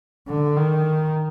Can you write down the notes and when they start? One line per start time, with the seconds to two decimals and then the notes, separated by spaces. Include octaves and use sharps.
0.28 D3
0.57 D#3